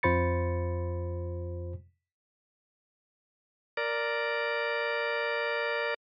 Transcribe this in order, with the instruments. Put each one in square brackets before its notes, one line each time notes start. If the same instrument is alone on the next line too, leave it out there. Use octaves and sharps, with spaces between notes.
[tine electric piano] F2 F4 C5 B5 A6 C#7
[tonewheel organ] A#4 D5